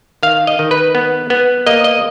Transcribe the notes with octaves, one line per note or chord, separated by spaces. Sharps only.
D#3 F5
D#5
D#3
B4
B3
B3
A#3 D#5
D#5